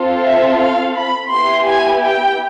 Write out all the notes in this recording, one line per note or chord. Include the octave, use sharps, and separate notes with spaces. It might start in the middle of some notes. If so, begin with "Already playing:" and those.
Already playing: C4 F4 A4
E5
F5
B5
B3 E4 G4 C6
G#5
G5